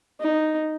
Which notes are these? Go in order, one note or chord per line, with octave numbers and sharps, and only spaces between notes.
D#4